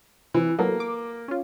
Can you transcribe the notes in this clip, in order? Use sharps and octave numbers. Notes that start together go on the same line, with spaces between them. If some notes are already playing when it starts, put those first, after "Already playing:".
C3 E3
F#3 A#3 B3 A4
D6
C#4 F4